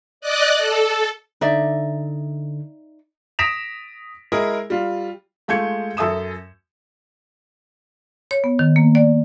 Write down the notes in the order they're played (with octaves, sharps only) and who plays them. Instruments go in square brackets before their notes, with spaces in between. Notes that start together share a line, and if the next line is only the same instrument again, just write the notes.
[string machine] D5 D#5 F#6
A4
[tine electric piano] D3 [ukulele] D#4 D5 E5
[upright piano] D#6 A#6 B6 D7 E7 F7
G#3 E4 G#4 A#4
G3 F4
[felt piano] G#3 A3 F4 G6 G#6 C#7
F#2 A4 E5 D#6 E7
[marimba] C#5
B3
D#3
A#3
D5